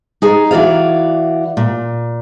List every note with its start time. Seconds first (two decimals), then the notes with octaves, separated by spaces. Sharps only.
0.22 D#4 G#4
0.51 E3 F#4 D5 F5
1.57 A#2